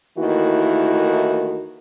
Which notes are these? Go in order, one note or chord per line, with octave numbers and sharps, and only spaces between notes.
D#2 D#3 E3 A3 E4 F#4